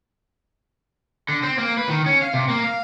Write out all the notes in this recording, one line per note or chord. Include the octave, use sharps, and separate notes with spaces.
D3
C4
A#3
B4
D#3
C#4
F5
C3
A#3
F5